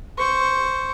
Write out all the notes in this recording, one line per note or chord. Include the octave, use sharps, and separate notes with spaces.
C5 C#6